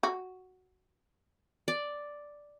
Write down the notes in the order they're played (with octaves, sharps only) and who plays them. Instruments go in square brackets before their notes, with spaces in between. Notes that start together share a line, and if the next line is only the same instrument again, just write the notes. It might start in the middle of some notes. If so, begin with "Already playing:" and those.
[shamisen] F#4
[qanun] D5